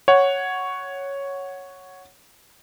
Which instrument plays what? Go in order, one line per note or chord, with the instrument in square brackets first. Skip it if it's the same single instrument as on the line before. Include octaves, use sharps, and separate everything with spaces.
[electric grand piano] C#5 F#5